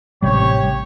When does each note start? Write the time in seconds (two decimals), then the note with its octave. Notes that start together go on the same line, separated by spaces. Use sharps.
0.22 A1 C3 G3 G4 C#5